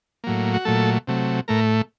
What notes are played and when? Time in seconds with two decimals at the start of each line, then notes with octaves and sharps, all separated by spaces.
0.24 A2 F#3 A#3
0.54 F#4
0.65 A#2 F#3 A3 A4
1.07 C3 F#3 A3
1.48 A2 A3 A#4